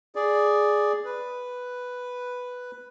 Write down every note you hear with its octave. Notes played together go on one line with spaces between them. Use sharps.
G#4 D5
B4